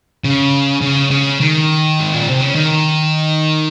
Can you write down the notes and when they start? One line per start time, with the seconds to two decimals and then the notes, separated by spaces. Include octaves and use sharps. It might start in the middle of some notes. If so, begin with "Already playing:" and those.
0.24 C#3
0.82 C#3
1.10 C#3
1.40 D#3
2.00 G#2
2.14 A#2
2.27 C3
2.41 C#3
2.55 D#3